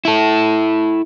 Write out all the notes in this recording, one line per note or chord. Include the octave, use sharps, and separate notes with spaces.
E4 A4